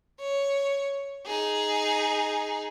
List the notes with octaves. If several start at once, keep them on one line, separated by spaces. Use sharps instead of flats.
C#5
D#4 G#4